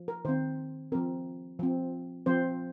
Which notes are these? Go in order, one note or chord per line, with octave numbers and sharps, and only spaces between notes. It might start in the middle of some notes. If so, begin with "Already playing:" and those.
Already playing: F3
A#4
D#3 C4 C5
F3 C4 A#4
F3 C4
F3 C4 C5